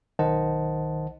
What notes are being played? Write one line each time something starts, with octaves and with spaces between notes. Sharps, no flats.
B1 D#3 C5 D#5 F#5 A5